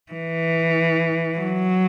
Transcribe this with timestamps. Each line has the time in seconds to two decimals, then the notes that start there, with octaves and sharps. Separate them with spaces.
0.12 E3
1.38 F#3